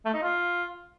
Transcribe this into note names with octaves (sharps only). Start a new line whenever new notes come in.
A3
D#4
F4